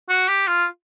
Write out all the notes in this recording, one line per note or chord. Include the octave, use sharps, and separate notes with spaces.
F#4
G4
F4